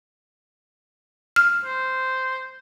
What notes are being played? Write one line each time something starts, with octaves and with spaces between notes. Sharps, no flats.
F6
C5